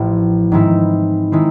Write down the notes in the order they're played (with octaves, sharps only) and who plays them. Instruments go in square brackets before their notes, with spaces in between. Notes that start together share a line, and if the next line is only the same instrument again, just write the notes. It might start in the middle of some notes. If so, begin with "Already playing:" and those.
Already playing: [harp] A1 A2 F3
G#2 D#3 G#3 C4 E4
D#3 G#3 C4 E4